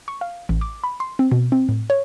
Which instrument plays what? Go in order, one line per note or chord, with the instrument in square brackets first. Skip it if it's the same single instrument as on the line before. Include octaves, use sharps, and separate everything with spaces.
[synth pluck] C#6
F5
A1
D6
B5
C6
C4
B2
C4
A2
C#5